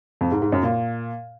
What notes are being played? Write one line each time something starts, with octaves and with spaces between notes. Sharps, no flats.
F2
G#2
G#2
F#2
A#2